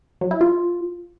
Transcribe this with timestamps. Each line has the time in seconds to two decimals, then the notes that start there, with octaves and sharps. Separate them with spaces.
0.21 F#3
0.31 E4
0.41 F4